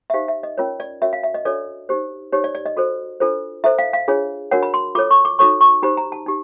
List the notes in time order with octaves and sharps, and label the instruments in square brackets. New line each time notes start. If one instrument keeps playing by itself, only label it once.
[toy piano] E5
D#4 G4 C5 F5
E5
D#5
C#4 F4 A#4 C#5
D5
C#4 F#4 A#4 C#5 E5
F5
E5
D#5
D4 F#4 A4 C#5 D5
D#4 G4 C5
D#4 G4 C5 C#5
D5
D5
D#5
F#4 A4 C5
D4 F4 A4 C5
E4 A4 C5 E5
F5
F5
D4 F4 G#4 C#5
D4 F#4 A#4 C#5 F#5
B5
C6
F4 A4 C#5 D6
C#6
D6
D#4 F#4 A4 C#5 C#6
C#6
D#4 G4 C5 B5
A#5
A5
D#4 G4